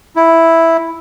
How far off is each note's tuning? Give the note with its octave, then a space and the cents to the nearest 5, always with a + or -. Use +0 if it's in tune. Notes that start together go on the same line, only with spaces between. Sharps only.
E4 +0